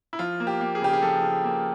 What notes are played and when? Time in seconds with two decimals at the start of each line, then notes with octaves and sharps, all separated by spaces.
0.13 E4
0.19 F3 F4
0.40 A#3
0.47 G4
0.61 A#3
0.75 G#4
0.82 C#3 G4
0.93 G#4
1.02 F3 A4
1.23 C#3
1.44 A#3